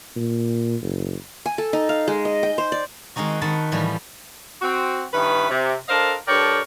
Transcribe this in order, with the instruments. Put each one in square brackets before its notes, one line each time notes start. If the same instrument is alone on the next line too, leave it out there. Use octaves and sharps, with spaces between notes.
[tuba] A#2
F#1
[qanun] G#5
A4
D#4
F5
G#3
D#5
G5
C5
D5
[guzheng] D#3 G#3 C4 D#4 F#4
D#3 D#4 F#5 A5 B5
A2 E3 F3 G3 E4
[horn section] C4 F#4
G2 D#3 C#4 E4 B4
C3
D4 A4 A#4 C5 D#5 F5
G2 A4 A#4 C#5 D5 G5